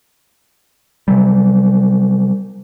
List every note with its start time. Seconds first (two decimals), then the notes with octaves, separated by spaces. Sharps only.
1.08 C3 F#3 G3